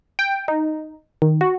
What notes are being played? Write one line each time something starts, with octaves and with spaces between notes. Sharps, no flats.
G5
D#4
D#3
F#4